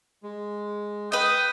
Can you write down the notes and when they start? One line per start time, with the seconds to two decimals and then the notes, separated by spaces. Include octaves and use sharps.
0.23 G#3
1.12 B4 D#5 G5 D#6